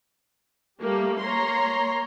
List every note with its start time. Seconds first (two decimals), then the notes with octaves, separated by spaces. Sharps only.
0.80 G3 A3 A#3 G4
1.21 A#3 C#5 A#5 C6